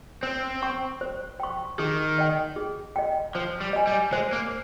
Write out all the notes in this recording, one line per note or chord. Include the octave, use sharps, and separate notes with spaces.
C4 C5
G5 C#6
C5
G5 C#6
D#3 G#4
D#5 G5
G#4
D#5 G5
F3 C5
G3
D#5 G#5
G3
G#3 C5
A#3